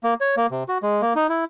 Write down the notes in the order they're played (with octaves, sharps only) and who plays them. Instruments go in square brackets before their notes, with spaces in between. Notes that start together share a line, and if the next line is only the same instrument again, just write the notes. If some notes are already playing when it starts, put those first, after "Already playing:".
[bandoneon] A#3
C#5
A#3
C3
F#4
G#3
A#3
D#4
E4